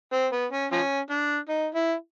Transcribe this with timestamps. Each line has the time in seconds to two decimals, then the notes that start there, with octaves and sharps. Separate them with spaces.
0.13 C4
0.32 B3
0.52 C#4
0.72 F3 C#4
1.10 D4
1.49 D#4
1.75 E4